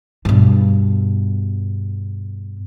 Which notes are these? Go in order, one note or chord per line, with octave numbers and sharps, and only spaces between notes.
G2 B2